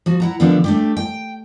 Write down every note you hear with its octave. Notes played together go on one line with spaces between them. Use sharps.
F3 F#4
E4 F#5 A#5
D#2 D3 F3 A3 B3 D4
A3 D4 G4
G5